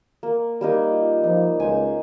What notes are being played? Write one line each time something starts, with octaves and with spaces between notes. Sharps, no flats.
A#3
G3 A#3 D#4
F4
F3 D#4
C#2 C5 G#5